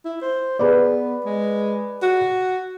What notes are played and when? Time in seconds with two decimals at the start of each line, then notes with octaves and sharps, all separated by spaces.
0.05 E4
0.22 C5
0.59 B3 G#4 B4 D5
1.25 G#3
2.02 F#4